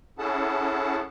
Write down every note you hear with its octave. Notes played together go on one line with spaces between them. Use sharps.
C#4 E4 G#4 A4 F#5 A5